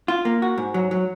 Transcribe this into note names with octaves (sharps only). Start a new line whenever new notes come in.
F4
A#3
F#4
G#2
F#3
F#3